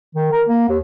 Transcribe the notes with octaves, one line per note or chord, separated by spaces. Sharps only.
D#3
A#4
A#3
D#2